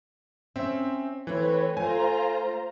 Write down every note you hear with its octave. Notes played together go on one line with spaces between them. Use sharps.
C4 C#4 E5
E3 A3 C4 B4 C#5
A3 F4 C5 G#5 A#5